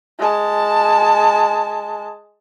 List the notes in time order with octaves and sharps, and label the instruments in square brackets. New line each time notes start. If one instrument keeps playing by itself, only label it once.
[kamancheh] G#3 A5